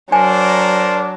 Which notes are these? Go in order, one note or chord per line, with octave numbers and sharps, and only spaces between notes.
F#3 D4 A#4 C5 D5 G#5